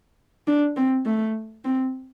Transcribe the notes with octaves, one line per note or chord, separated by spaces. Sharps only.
D4
C4
A3
C4